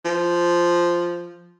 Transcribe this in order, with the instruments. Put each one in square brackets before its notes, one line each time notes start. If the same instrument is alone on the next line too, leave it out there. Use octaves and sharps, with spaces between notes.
[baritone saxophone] F3